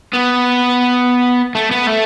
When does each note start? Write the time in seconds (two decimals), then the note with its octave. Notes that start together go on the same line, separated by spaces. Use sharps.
0.13 B3
1.55 A3
1.71 B3
1.87 A3